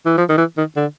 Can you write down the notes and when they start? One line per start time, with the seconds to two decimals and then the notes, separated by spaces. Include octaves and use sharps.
0.06 E3
0.18 F3
0.29 D#3
0.38 E3
0.58 D#3
0.76 D3